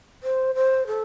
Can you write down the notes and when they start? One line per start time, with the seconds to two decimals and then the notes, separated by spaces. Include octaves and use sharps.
0.23 C5
0.55 C5
0.87 A4